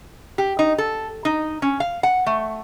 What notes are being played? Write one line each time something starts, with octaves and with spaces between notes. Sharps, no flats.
G4
D#4
A4
D#4
C#4
F5
F#5
A3